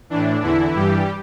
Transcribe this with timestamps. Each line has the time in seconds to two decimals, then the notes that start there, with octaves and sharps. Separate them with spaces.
0.10 A2 E3 D4
0.42 E2 D3 E3 E4
0.75 G2 E3 G3 G4